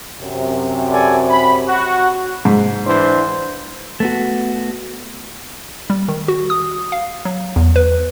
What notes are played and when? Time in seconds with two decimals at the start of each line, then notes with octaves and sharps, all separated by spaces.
0.21 F#2 C3
0.91 A4 D5 G#5
1.29 B5
1.67 F#4
2.45 G#2
2.87 E3 D4 C5
4.00 A3 B3 F#4
5.90 G3
6.08 D#3
6.28 F#4
6.50 D#6
6.92 F5
7.25 F#3
7.56 E2
7.76 B4